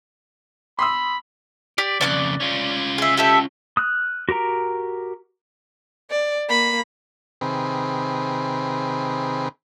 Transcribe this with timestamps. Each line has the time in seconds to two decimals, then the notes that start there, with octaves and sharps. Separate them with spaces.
0.79 B5 C6 D#6 E6
1.78 G4 D5
2.01 F2 C#3 D5 D6 F#6
2.40 C#4 F4
2.98 G#4 E5
3.17 G4 A4 E5
3.77 D#6 F6 F#6
4.29 F#4 G4 A#4 A#5
6.11 D5
6.49 A#3 B5
7.41 C3 D#3 C4 G#4 B4